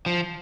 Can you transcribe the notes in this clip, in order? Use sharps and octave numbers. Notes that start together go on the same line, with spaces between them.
F3